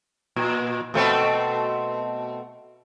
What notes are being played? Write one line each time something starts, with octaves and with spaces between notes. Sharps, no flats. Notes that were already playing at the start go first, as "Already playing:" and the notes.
A#2
B2 A3 C4